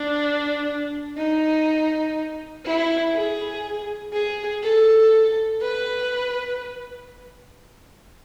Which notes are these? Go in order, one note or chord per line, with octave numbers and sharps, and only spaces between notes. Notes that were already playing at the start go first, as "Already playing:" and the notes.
Already playing: D4
D#4
E4
G#4
G#4
A4
B4